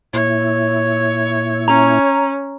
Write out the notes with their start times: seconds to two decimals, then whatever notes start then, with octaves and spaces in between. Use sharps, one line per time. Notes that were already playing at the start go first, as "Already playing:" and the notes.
0.13 A#2 E4 C#5
1.68 C#4 A#5